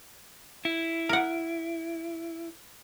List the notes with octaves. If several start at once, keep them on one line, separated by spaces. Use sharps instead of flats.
E4
A#4 F#5